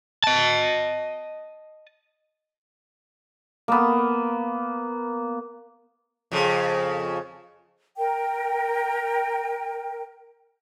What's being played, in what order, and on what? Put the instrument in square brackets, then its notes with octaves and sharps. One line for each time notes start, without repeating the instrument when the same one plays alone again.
[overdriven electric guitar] D#5 A5
[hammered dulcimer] A#3 B3
[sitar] F2 C#3
[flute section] A#4 G5